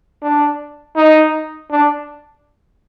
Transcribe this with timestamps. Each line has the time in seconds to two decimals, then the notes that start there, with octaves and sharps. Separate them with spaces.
0.22 D4
0.96 D#4
1.71 D4